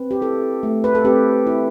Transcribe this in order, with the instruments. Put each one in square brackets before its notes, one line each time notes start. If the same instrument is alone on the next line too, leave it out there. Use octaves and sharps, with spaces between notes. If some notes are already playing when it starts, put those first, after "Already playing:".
Already playing: [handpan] C4 B4
G4
E4 A4
A3
B4
A4
C4 G4
E4